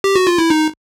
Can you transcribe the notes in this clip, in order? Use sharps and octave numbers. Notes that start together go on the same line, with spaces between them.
G4
F#4
F4
E4
D#4